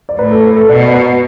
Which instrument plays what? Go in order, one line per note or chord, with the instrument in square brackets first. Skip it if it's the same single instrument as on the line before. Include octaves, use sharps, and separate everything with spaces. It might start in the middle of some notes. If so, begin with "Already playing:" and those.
[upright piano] D5
[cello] A2 [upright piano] B4
[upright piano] A4
B4
A4
[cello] B2 [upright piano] D5
[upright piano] B4